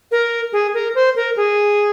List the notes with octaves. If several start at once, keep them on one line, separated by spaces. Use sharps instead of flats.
A#4
G#4
A#4
C5
A#4
G#4